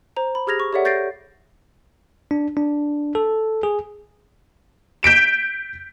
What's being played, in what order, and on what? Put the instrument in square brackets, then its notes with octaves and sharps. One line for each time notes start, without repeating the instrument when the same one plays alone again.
[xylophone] C5 A#5
B5
G4 G#4 F6 G#6 A#6 F7
C#6
G4 A4 C#5 D5 E5 F#5
C#6 G6 A6 A#6 C7 D7
[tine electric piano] D4
D4
A4
G#4
[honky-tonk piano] G6 B6 D7 E7